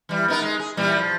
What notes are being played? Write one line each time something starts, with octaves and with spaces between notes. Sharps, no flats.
E3 G3
B3 D#4 A#4
G#3 D#4
G#4
A#2 E3 G3
F3